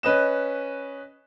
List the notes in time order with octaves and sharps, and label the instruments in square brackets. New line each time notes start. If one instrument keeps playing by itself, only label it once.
[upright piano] C#4 B4 D#5 E7